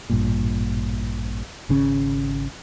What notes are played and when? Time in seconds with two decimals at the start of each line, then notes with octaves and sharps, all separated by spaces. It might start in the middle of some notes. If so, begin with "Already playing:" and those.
0.10 A1 G2 A#2
1.69 G#1 C#3 C#4